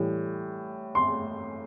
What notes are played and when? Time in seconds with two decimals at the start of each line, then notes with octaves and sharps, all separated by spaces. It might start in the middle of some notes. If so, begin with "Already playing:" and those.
Already playing: A2 E3 G3
0.95 C6